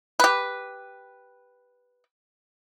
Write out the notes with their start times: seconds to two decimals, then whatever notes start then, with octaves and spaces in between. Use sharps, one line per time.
0.20 G4 B4